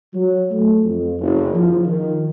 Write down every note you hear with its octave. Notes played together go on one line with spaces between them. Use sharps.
F#3
A3
F2
F#1
F3
D#3